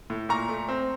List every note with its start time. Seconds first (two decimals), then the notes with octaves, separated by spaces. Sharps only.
0.10 A2
0.29 A#2 A#5 C#6
0.49 A3
0.69 C4